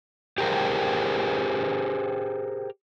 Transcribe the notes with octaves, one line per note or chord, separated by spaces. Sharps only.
G4 G#4 A#4 C5 G5